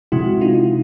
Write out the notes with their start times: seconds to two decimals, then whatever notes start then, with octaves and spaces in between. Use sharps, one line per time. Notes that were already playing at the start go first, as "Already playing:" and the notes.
0.12 C3 F3 G#3 E4 F#4
0.41 D#4 F4